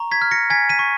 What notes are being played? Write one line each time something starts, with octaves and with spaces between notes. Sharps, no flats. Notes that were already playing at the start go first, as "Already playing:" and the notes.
Already playing: A#5 C#6
G#6 B6
F6
A#6 C#7
G#5 G#6 B6
B6 D#7
C#6